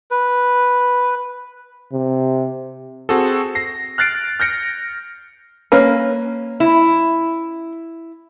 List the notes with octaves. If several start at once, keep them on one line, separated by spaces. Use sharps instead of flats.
B4
C3
C4 F#4 G#4 A4
A#6 C7
F6 F#6 A6 C7 D7
F6 G6 A#6 C#7 D7
A#3 C#4 B4
E4